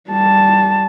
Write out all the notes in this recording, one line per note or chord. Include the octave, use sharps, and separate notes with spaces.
G3 A5